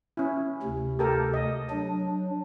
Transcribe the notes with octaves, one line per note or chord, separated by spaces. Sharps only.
C#4 E4
D2 C3
G4 A4 A#4
D#5
F#3 D4